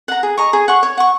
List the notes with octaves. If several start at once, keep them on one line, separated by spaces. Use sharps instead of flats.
F#5 A#5
G#4
D#5 A#5 C#6
G#4
F#5 C#6
C#5
F#5 C#6